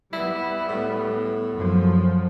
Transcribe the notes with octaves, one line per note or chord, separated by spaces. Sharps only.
G3 B3 E4
A2
F#2 F3